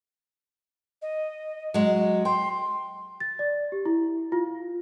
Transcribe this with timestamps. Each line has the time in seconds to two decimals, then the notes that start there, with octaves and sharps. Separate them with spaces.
1.02 D#5
1.74 F#3 G#3
2.25 G5 C6
3.20 A6
3.39 D5
3.72 G4
3.85 E4
4.32 F4